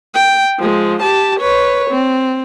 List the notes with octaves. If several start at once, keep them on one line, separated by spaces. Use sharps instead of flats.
G5
F3 G#3
G4 A5
B4 C#5
C4